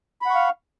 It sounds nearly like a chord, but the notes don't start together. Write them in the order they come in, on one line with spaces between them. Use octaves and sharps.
B5 F#5 C#6 F5